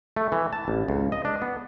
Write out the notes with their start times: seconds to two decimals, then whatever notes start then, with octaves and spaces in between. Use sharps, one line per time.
0.16 A3
0.32 E3
0.53 A5
0.68 A1
0.88 C#2
1.12 D#5
1.25 D4
1.42 B3